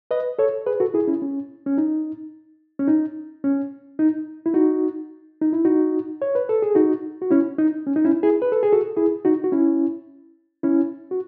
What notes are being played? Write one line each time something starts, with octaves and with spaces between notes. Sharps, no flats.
B4 D#5
A4 C#5
G#4 B4
F#4 A4
E4 G#4
C#4 E4
C#4
C#4
D#4
C#4
D#4
C#4
D#4
E4
D#4 F#4
D#4
E4
D#4 F#4
C#5
B4
A4
G#4
D#4 F#4
F#4
C#4 E4
D#4
C#4
D#4
C#4 E4
E4 G#4
B4
A4
G#4
F#4 A4
E4 G#4
D#4 F#4
F#4
C#4 E4
C#4 E4
F#4